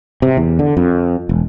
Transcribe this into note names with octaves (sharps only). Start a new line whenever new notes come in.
C3
E2
D3
F2
E1